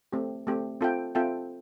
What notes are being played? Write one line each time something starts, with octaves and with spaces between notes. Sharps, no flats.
A3 C4 G4
A3 C4 G4
C4 F4 A4 E5 G5
C4 F4 A4 E5 G5